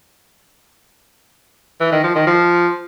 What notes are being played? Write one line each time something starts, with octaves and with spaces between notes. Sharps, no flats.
E3
D#3
F3
D#3
F3